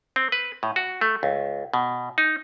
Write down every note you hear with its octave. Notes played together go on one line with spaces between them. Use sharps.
C4
B4
A2
F#4
A3
C#2
B2
D#4